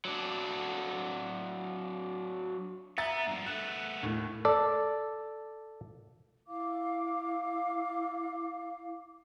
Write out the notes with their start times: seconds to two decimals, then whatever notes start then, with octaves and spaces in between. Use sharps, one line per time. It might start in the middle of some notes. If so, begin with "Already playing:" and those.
0.05 F#3 D4
2.98 B3 E5 A#5 A6
3.27 G2 F3
3.46 A3 B3 F#6
4.03 D#2 A2
4.45 A4 D5
6.47 E4 F5 D6